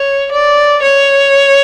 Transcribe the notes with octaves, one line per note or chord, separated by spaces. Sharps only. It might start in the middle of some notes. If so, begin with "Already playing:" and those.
Already playing: C#5
D5
C#5